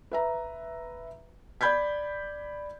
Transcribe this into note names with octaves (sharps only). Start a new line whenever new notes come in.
B4 E5 A#5
D5 B5 G6 G#6 B6